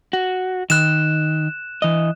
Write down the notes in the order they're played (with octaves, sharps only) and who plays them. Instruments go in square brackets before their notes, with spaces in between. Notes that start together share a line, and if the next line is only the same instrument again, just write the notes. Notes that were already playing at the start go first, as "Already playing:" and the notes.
[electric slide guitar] F#4
[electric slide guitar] D#3 [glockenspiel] F#6 E7
[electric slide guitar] E3 D#5